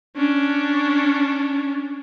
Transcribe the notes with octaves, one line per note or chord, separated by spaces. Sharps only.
C#4 D4